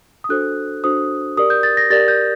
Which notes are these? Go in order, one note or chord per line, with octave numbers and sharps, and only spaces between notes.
D#6
D4 F#4 A4 C5 F#6
D4 F#4 A4 C5 D#6
G4 A#4 D5 D#6
G6
A6
A#6
G4 A#4 D5 A6
G6